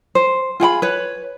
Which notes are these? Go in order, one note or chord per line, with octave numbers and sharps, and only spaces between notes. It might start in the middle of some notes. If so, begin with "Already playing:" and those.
C5
F4 G#4 F#5 B5
B4 C#5